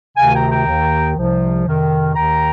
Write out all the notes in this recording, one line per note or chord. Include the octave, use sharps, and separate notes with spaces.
D2 C3 D#3 F5 G#5
G5 A#5
G5 A#5
D#2
D#3
C2 C3 F3
F2 C3 D#3
D#2 D#3 G5 A#5